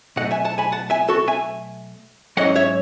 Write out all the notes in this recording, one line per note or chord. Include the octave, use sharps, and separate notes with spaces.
B2 F#3 A3 D#5 F#5
E5 G#5
F#5 A5
G#5 B5
F#5 A5
E5 G#5
F#4 A4
E5 G#5
G#2 F#3 C#4 E4 D#5 F#5
C#5 E5